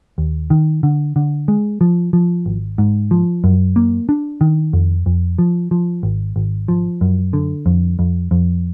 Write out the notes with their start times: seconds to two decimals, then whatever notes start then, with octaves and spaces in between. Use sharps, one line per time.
0.18 D#2
0.50 D#3
0.83 D3
1.16 D3
1.48 G#3
1.81 F3
2.13 F3
2.46 G#1
2.78 G#2
3.11 F3
3.44 F#2
3.76 A#3
4.09 D4
4.41 D#3
4.73 F2
5.06 F2
5.38 F3
5.71 F3
6.03 G#1
6.36 G#1
6.68 F3
7.01 F#2
7.33 D3
7.66 F2
7.99 F2
8.31 F2